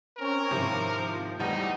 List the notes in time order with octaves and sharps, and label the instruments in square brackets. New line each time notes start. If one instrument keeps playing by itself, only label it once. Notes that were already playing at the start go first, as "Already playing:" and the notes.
[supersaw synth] C4 C#4 C#5 [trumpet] A#4
[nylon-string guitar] G#2 D#3 E4 [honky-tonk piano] C3 [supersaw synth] F3
[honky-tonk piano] E2 A2 [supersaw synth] G3 [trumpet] D#4